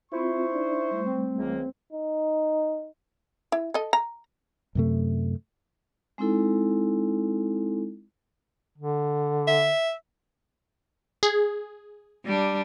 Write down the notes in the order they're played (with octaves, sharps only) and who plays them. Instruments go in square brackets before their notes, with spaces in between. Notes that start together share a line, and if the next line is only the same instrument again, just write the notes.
[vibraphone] C4 F4 [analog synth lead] E4 [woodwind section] C5 C#6
[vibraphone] D4 D#4 D5
G3 A3
[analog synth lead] C4
[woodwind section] C#2 E3 A#3
[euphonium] D#4
[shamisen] E4
A4 D#5
A#5
[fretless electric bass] F#2 C3 A3
[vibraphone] G#3 C4 D#4 E4 A4
[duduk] D3
[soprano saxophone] E5
[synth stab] G#4
[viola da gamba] G3 D4